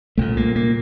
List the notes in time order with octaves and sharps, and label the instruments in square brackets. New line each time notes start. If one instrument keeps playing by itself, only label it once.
[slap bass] C2 A#2 A3
A#3
A#3